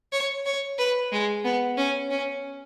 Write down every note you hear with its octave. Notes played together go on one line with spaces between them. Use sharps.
C#5
C#5
B4
G#3
B3
C#4
C#4